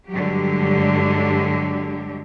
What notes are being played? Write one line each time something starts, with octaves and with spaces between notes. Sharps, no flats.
G2 D3 F#3 G#3 G4